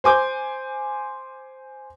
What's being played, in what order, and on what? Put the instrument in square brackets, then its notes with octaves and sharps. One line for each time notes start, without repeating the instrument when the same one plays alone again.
[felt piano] C5 G#5 D6 G6